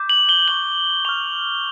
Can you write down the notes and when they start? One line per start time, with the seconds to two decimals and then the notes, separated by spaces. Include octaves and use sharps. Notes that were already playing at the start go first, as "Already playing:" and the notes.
Already playing: D6 G6
0.09 F#7
0.29 G7
0.47 C#6 F#6 F#7
1.05 C#6 F6 F7